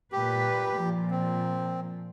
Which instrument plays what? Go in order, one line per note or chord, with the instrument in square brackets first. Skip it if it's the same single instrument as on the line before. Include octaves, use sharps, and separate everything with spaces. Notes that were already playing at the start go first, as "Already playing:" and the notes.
[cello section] A#2 B4 [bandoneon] G4
[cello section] A#2 F3
[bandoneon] C4